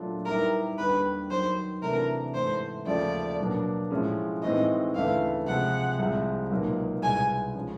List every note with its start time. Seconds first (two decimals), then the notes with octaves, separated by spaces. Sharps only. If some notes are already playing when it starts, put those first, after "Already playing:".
Already playing: A#2 F#3 A3 D4 F4
0.26 D#3 G3 B3 E4 G4 A#4
0.78 D#2 D3 G3 B3 B4
1.31 D#3 F#3 B3 C5
1.82 C3 E3 A3 D4 F#4 A#4
2.35 G#2 E3 A3 C5
2.87 D#2 C#3 F3 A3 D5
3.39 B2 F#3 A#3 D4
3.91 A2 F3 G#3 C#4
4.43 A2 E3 G#3 C4 D#4 D#5
4.95 D2 C#3 E3 A3 F5
5.47 C3 F3 G#3 F#5
5.99 C2 C3 F3 G#3
6.51 C#2 B2 F#3 A#3 D#4
7.03 C2 B2 G#3 G#5
7.55 C#3 F3 G#3 C#4